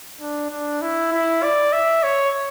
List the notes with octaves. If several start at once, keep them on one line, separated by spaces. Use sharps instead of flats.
D4
D4
E4
E4
D5
E5
C#5